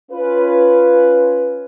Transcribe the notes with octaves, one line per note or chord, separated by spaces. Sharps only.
C#4 F4 B4